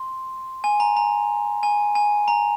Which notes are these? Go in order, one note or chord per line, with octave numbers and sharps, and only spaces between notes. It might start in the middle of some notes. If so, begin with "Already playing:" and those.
Already playing: C6
G#5
A#5
A#5
G#5
G#5
A#5